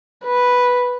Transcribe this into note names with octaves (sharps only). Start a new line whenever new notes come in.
B4